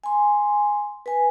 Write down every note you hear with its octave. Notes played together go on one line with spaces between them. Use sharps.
G#5 C6
B4 G#5